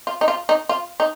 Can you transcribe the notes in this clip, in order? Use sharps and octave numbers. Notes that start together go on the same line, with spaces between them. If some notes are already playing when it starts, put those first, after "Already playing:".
F4
D#4
F4
D#4
F4
D#4